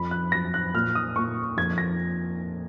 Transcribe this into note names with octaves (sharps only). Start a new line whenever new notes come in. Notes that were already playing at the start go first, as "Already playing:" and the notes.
Already playing: F2 B5
F#6
F#3 A#6
F#6
A#2 F6
D#6
A#2 C#6
F2 G#6
A#6